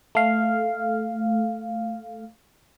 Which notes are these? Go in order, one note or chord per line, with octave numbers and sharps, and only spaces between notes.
A3 F5